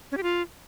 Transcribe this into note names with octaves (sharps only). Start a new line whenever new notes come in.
C#4
G4
F4